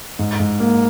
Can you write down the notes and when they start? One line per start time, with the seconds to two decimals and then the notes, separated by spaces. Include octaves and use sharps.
0.19 G#2
0.40 G#2
0.60 A#3